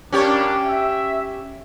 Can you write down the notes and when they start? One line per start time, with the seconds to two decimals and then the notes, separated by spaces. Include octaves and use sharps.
0.13 G3 A#3 C#4 D4 G4 C#5
0.66 E5